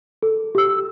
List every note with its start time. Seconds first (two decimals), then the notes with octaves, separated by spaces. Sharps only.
0.23 A4
0.55 G4 E6